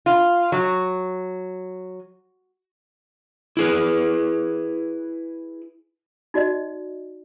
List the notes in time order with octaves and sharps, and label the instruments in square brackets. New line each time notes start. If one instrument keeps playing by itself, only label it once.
[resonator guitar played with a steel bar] F4
F#3
[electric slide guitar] E4 G#4 B4
[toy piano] D#4 F#4 D5 D#5